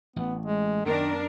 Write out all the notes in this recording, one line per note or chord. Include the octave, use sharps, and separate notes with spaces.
A1 B3
G#3
F#2 D#3 B3 D4 A#4